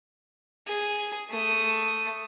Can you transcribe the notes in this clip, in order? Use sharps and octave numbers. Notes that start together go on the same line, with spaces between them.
G#4
A3 D#6